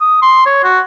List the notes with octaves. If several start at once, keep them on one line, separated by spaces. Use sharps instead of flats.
D#6
C6
C#5
F#4